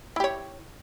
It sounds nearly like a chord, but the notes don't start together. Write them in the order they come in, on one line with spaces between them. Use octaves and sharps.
E4 G4 C#5